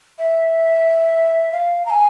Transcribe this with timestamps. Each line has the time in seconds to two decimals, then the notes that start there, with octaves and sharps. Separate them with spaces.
0.19 E5
1.52 F5
1.86 A#5
1.90 G#5